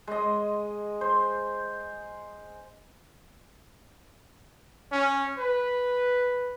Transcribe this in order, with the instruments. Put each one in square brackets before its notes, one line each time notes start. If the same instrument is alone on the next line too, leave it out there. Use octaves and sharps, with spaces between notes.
[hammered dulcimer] G#3 D#5
C5
[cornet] C#4
B4